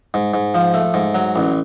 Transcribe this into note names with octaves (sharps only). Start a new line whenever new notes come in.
G#2
G#2
F3
A3
G#2
F#3
A1